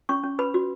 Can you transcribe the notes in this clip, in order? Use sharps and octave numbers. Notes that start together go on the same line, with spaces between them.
C#4 C#6
C#4
B4 B5
F#4